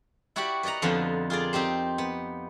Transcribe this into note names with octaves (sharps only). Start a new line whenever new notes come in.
E4 F#4 G4 D5 F#5 B5
B4 D5 D#5 F#5 A#5
F2 D3 F3 B3 D#4 F4
F4 G#4 A#4 D5
C4 D#4 G4 C5
B3